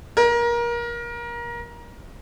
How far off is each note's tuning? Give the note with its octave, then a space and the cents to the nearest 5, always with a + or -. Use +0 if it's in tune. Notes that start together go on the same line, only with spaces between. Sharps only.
A#4 +25